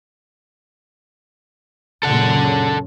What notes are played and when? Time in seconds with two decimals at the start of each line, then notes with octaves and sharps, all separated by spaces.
2.03 F#2 A#2 C#3 A4 F#5